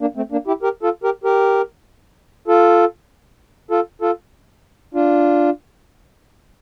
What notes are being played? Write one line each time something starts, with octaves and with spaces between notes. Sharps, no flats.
A#3 D4
A3 C4
A#3 D4
E4 G4
G4 A#4
F4 A4
G4 A#4
G4 A#4
F4 A4
F4 A4
F4 A4
D4 F4